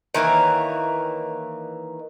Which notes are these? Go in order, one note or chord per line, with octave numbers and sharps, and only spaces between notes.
D#3 E3 A#3 C#5